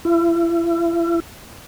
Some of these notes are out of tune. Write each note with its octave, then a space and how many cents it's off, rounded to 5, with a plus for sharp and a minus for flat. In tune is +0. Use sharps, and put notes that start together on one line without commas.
E4 +40